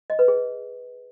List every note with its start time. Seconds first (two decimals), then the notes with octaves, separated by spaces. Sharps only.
0.10 D#5
0.19 B4
0.28 G#4